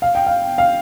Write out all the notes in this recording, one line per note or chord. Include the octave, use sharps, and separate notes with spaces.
F5
G5
F5
F5